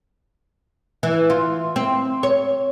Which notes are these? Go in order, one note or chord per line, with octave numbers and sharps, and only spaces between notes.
E3
F4
C4
C#5